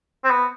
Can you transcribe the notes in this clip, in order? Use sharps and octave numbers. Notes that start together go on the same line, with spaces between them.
C4
B3